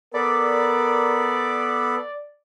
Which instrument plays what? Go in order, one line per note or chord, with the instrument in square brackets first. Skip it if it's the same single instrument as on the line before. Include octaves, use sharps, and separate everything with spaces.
[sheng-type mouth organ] B3 A4 B5 [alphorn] A#4 [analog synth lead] D5